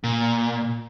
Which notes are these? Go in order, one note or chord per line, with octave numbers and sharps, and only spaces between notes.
A#2